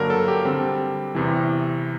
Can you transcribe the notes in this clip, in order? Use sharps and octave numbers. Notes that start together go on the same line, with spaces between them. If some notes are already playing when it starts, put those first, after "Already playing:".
Already playing: G2 D3 F#3 A#3 D4 A#4
A4
G4
D3 G3 C4
E2 C3 E3